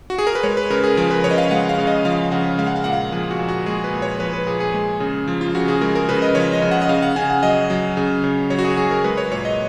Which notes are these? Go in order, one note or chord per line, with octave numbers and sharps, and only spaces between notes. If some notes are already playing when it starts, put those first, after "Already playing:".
F#4
G#4
A#4
B4
G#3 C#5
B4
C#3 A#4
G#4
F3 A#4
B4
C#3 C#5
D#5
F5
G#3 F#5
F5
C#3
D#5
F3 F5
C#3 F#5
G#3 F5
F#5
F5
A#2 F#5
F5
F3 G#4
F#4
A#2
F#4
G#3 G#4
B4
A#2
C#5
F3 B4
B4
A#2 G#4
G#4
G#3
C#3
F3
F4
C#3 F#4
G#4
G#3 A#4
A#4
C#3 B4
D#5
F3 C#5
D#5
C#3
F#5
D#5
C#3 F5
F#5
C#3 G#5
F#5
F#3 D#5
F#3
C#3
C#3
F#3 C#5
F#4
G#4
F#3 G#4
A#4
G#3 B4
C#5
A#2 C#5
D#5